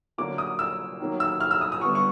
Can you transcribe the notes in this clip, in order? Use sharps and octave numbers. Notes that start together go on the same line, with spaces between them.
D3 F#3 A#3 D6
D#6
E6
D#3 F#3 A#3
E6
F6
E6
D#6
D#6
D3 G3 B3 C#6
C#6